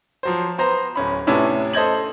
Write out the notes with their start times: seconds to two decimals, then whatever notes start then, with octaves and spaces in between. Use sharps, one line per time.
0.23 F3 F#3 C5
0.58 B3 C5 A#5
0.96 D1 C#4 B5
1.27 A2 C3 B3 C#4 D4 E4
1.73 A4 C5 D#5 G6 G#6 F#7